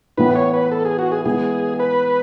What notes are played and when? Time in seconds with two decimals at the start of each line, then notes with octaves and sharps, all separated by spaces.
0.17 A2 E3 B3 B4
0.35 C#5
0.53 B4
0.71 A4
0.85 G#4
0.99 F#4
1.12 G#4
1.25 E3 G#3 B3 G#4
1.79 B4